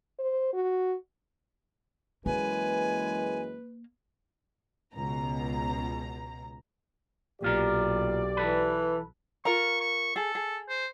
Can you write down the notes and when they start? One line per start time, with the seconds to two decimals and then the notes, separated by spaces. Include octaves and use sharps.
0.19 C5
0.53 F#4
2.26 F#2 E3 G#3 A#3 B4 G#5
4.94 C#2 B2 A#5
7.42 B1 A#2 F4 G4 A#4 D5
8.37 E3 A4 B4
9.45 F4 A#4 A#5 C#6
9.80 C#6
10.16 G#4 A4
10.35 G#4
10.69 C5